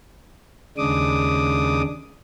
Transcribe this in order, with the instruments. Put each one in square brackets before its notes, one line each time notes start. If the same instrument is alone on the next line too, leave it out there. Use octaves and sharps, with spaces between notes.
[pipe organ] D#2 C#3 G#3 D4 D6 D#6